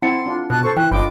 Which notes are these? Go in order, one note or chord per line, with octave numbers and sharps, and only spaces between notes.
C4 E4 F#5 A5 C6 C#7
D4 F4
B2 A5 F#6
A4 C5 C#6
E3 G5 F#6
G1 D4 F4 D#5 G5 B5 D6